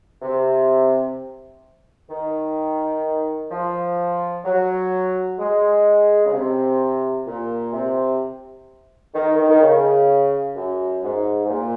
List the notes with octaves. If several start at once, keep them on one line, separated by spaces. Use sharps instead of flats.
C3
D#3
F3
F#3
G#3
C#3
C3
A#2
C3
D#3
D#3
D#3
C#3
F#2
G#2
G#2
A#2